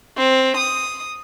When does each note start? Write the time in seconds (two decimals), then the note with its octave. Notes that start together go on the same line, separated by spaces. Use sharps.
0.17 C4
0.57 D#6